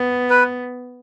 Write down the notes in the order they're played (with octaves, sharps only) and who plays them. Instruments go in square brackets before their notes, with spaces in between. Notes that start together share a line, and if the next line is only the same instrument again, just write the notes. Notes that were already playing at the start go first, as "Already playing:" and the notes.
Already playing: [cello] B3
[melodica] B4